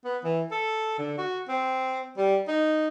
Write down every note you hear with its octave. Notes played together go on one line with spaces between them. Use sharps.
B3
E3
A4
D3
F#4
C4
G3
D#4